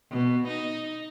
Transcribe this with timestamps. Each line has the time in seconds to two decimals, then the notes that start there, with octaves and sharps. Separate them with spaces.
0.10 B2
0.48 D#4